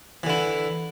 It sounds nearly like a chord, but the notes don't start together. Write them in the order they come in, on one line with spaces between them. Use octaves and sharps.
E3 D3 E4